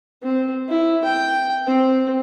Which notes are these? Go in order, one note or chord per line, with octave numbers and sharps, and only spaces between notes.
C4
E4
G5
C4